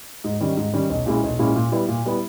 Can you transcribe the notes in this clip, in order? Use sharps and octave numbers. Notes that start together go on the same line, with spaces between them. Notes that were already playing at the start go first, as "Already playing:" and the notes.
G#2
D#3 G3 C#4
G#2
D#3 G3 C#4
B1
A#2 G#3 C#4 E4
B1
A#2 G#3 C#4 E4
A#2
G3 B3 E4
A#2
G3 B3 E4